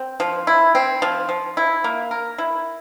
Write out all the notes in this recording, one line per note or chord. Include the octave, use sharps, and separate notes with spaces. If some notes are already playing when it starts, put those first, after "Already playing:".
Already playing: C4
F3
E4
C4
F3
F3
E4
A#3
A#4
E4